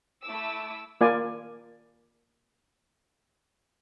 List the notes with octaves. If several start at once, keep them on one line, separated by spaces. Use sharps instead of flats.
A3 E4 D6 E6
A#3 F4 D5 G#5